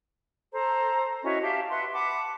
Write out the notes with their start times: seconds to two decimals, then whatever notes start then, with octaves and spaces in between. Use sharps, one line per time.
0.52 A4 C5 A#5
1.23 C#4 E4 F#4 D#5
1.41 G4 E5 F5 A5
1.69 B4 E5 F#5 C6
1.93 F#5 A5 B5 D6